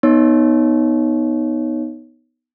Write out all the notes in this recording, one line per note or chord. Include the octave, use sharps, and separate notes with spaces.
B3 D#4 C#5